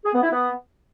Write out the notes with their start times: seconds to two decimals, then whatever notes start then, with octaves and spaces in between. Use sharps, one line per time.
0.05 G#4
0.14 B3
0.22 E4
0.31 B3